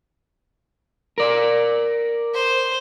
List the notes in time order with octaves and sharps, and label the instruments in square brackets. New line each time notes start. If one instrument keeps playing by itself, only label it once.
[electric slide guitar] A#4 D5
[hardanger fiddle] C5